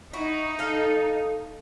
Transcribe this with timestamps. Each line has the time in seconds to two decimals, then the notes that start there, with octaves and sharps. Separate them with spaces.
0.13 D#4 E4 F#4
0.59 A4 F5